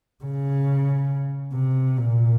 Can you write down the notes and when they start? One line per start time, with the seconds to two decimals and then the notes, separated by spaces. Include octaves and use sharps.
0.24 C#3
1.54 C3
1.97 A#2